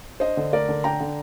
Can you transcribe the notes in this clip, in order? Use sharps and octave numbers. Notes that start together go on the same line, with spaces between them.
D4 C5 D#5
D3
A3 A#4 D5
D3
D4 G5 A#5
D3